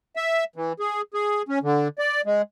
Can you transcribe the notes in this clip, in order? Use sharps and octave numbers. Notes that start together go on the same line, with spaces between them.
E5
E3
G#4
G#4
C#4
D3
D5
G#3